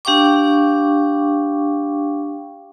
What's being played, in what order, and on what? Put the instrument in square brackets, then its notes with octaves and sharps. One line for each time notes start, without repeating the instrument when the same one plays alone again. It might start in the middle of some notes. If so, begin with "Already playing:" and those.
[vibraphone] D4 G4 F5 G5 C#6 D6